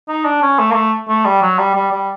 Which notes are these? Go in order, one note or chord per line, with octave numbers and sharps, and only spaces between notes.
D#4
D4
C#4
A3
A#3
A3
A3
G3
F#3
G3
G3
G3